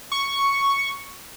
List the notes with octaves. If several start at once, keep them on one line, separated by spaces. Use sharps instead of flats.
C#6